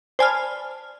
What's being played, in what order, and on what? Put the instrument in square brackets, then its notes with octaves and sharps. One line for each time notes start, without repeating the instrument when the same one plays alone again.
[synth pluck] C5 D5 G#5 A5 B5 F6